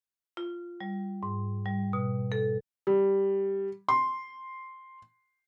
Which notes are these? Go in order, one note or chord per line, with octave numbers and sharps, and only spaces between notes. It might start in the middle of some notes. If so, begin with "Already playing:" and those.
F4
G3
G#2
G3
B2
A4
G3
C6